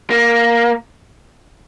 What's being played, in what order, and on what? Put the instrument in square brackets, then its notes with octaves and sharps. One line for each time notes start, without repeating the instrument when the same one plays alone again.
[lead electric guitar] A#3